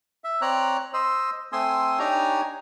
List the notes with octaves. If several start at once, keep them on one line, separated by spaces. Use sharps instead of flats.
E5
C4 C#5 D5 A#5 F#6
C5 D#5 E6
A3 C4 G#5 C6 D#6 E6
D4 D#4 G4 C#5 G#5 A#5